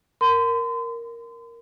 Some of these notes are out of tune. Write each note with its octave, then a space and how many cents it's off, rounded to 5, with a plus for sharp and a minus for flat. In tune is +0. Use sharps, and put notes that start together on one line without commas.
A#4 +0 C6 -40